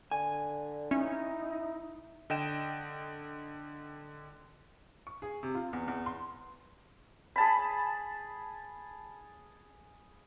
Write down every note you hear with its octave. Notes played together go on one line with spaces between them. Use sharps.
D3 G#5
C#4 D#4 E4
D3 D#5 G5 E7
C#6
G#4
C3
F4
E2
E2
C6
G#4 A5 B5